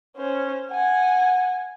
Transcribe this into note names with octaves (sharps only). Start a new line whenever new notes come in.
C#4 C5
F#5 G#5